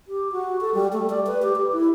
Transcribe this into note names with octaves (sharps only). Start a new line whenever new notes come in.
G4
F#4
A4
G3
A3
D5
B4
G4
G4
E4